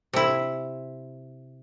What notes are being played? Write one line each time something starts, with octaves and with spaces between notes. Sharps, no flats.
C3 E4